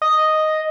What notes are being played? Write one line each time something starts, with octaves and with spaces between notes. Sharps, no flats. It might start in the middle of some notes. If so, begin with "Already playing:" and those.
D#5